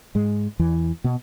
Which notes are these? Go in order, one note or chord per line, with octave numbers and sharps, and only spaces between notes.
G#2 G#3
E2 E3
B2 B3